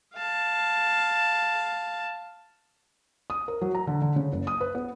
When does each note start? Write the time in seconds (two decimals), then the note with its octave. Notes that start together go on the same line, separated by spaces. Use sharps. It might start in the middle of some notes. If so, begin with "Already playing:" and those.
0.14 F5 A5
3.30 D#6
3.48 A#4
3.61 F#3
3.75 A#5
3.87 D3
4.02 D3
4.16 C#3
4.33 F#1
4.47 D#6
4.61 B4
4.75 B3